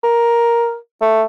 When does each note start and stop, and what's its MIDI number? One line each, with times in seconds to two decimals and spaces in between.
0.04 0.76 70
1.02 1.23 57